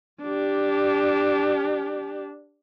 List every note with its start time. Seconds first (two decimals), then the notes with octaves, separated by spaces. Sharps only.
0.23 D4 G4